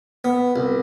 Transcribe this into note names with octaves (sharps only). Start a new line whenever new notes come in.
B3
C2